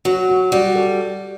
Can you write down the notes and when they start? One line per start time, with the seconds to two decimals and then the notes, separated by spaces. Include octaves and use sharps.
0.05 F#3 F#4
0.29 F#4
0.52 G3 F#4
0.76 A4